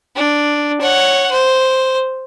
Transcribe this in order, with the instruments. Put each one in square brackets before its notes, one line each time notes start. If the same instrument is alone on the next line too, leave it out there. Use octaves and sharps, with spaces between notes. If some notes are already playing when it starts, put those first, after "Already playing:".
[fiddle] D4
C#5 F#5
C5